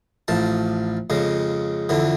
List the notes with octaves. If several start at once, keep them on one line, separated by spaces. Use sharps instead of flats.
A1 F3 A5
F2 C#3 G#3
F2 D3 E3